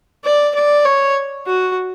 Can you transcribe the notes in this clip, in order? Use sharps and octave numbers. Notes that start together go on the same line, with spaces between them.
D5
D5
C#5
F#4